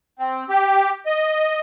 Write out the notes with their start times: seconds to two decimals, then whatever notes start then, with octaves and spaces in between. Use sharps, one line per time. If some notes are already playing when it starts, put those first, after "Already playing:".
0.19 C4
0.49 G4
1.06 D#5